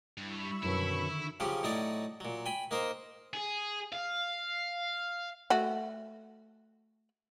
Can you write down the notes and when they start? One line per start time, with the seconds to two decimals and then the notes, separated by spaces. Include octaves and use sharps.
0.18 G2 G3 E4 B5 C#6 E6
0.63 F#2 B2 D3 D#3 E4
1.40 C#3 F3 F#3 C#4 G4
1.63 A2 F#3 D#4 C#5 D5 C#6
2.20 A#2 F#3
2.46 G5 G#5 B5
2.71 A#3 D#4 A#4 C5
3.34 G#4
3.93 F5
5.50 A3 F#4